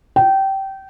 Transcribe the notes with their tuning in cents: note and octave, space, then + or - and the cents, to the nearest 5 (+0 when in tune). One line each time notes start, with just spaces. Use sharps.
G5 -20